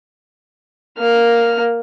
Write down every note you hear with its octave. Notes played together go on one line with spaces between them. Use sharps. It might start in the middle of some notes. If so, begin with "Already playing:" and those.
A#3 F6